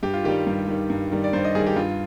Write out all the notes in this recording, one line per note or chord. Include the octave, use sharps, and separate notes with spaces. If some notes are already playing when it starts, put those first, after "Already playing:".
G2 G4
F4
D#3 G3 G4
G2
D#3 G3
G2
D#3 G3
D5
G2 C5
D#5
D#3 G3 G#4
G4
G2 F4